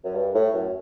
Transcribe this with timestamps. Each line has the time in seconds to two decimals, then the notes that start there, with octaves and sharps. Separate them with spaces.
0.04 F#2
0.15 G2
0.35 A2
0.54 F#2